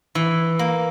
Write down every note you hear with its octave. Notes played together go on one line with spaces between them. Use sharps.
E3
A#3